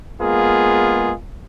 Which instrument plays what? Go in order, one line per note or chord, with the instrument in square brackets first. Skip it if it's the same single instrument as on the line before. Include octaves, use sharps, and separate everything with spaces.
[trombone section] G#3 A#3 B3 F4 G#4